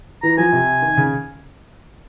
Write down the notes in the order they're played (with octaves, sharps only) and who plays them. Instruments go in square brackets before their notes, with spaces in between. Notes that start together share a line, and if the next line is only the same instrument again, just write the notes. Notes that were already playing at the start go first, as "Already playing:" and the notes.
[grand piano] E3 [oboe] A#5
[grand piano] F3 [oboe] G#5
[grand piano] C3
D#3
C#3